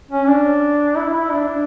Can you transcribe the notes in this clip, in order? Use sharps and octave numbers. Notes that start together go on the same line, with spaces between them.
C#4
D4
E4
E4
D4
D4